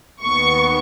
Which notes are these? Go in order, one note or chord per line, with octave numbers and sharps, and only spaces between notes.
D#2 D#3 B3 C#6